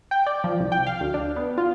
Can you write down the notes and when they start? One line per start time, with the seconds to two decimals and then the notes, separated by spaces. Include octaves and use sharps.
0.11 G5
0.26 D5
0.44 F3
0.60 C2
0.72 G5
0.87 F5
1.01 D2
1.14 D4
1.36 B3
1.58 F4